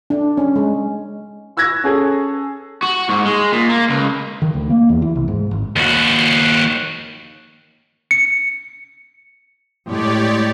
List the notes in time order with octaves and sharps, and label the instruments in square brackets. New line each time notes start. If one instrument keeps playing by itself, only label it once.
[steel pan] D4
C#4
G#3
[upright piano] C#6 E6 F#6 G#6 A#6
C#4 G#4 A4
[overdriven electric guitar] F#4
G#2
G#3
A#2
A#3
C#2
[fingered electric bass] D#3
D2
A#3
E2
E3
C2
G#2
G#1
[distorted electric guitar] D#2 F#4
[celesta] C#7
[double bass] A2 G#3 [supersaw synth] G4 C#5 D5